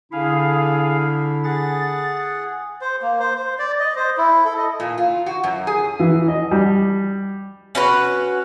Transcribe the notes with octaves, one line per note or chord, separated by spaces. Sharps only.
D3 D4 E4 G#4 F5
G#4 F#5 A6
C5
A#3
C5
C5
D5
D#5
C5
E4
A4
D#5
A#2
F4
F#4
F#2
G#4
E3
D#5
G3
C#4 F#4 B4